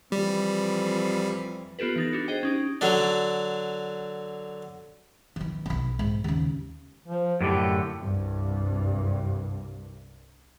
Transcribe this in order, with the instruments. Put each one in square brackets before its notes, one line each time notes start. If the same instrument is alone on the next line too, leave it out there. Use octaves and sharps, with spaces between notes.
[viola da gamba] F2 E3 [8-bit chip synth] G3
[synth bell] B3 F4 G4 A4 B4
E3 D#4 A6
D4 F#4
G#4 C5 D#5 G5
C#4 D#4 G4
[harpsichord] D3 F#3 D4
[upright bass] D#3 E3
B1 B3
G#2
D#2 C#3
[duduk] F3
[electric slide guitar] F#2 A2 D3 [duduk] G4
[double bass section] C2 G2